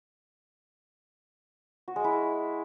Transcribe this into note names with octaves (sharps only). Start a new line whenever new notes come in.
F#4
G#3
E4